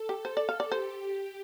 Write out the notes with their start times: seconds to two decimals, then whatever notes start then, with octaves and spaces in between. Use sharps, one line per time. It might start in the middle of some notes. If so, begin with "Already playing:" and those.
Already playing: A4
0.09 G4
0.25 C5
0.37 D5
0.49 F5
0.60 D5
0.72 G4 C5